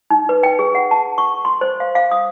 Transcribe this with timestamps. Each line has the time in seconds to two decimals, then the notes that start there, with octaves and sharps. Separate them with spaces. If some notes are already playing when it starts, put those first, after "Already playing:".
0.10 D#4
0.29 B4
0.43 G5
0.59 G#4
0.75 F#5
0.91 A5
1.18 C#6
1.45 C6
1.61 C5
1.80 F5
1.95 F5
2.11 D#6